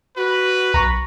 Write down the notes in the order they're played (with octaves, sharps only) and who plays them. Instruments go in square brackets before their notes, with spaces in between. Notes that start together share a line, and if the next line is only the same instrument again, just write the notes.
[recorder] F#4 [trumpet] B4
[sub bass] B1 [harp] A#5 C#6